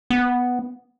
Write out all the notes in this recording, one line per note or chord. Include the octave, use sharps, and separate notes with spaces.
B3